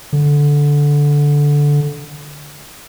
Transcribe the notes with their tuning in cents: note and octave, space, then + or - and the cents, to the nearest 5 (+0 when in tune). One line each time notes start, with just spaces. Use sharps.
D3 -10